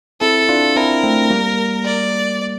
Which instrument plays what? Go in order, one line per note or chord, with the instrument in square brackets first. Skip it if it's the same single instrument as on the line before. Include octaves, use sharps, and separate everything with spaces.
[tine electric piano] C4 E4 [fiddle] A4
[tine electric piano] D4 F4
[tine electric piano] C4 E4 [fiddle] A#4
[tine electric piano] A3 C4
G3 A#3
[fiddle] D5